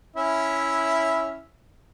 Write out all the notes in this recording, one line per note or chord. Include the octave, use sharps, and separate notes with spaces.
C#4 E4 E5